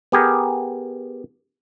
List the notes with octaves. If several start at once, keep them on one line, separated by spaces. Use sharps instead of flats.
B3 G4 G#4 A#4